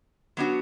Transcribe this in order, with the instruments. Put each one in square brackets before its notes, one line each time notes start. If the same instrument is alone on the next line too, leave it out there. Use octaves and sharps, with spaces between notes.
[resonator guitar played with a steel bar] F#3 B3 D4 F#4